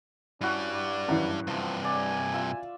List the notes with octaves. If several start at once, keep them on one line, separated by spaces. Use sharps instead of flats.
G2 G3 C#4 E4 F#4
D5
F#2 E3
G2 C3 F3
D5 G#5
F4 E5